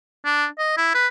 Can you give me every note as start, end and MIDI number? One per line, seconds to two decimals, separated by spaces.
0.25 0.46 62
0.58 0.73 75
0.77 0.92 64
0.95 1.07 71